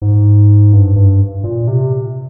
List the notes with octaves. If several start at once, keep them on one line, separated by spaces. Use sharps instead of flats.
G#2
G2
G2
A#2
C3